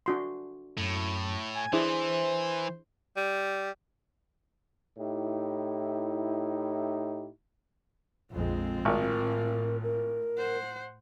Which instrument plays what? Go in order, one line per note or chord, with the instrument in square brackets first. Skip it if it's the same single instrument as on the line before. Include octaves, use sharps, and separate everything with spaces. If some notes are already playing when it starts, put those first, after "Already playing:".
[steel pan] D4 F#4 C6
[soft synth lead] F#2 [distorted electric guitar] A2
[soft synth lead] G#5
[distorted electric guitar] E3 [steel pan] D4 E4 G#4 [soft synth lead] C5
[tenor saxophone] G3
[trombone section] A2 D#4 E4 G4
[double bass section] A#1 F2 G#3 [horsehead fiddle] C4 F4
[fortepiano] G#1 [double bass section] A2 [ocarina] A#4
[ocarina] A#4
[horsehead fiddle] C5 F#5